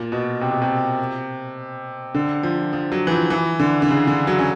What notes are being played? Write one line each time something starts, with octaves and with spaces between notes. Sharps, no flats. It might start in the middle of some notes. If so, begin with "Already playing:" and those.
Already playing: A#2
B2
C3
B2
C3
D3
F3
F3
F#3
E3
F3
E3
D3
D3
C#3
D3
F#3
C#4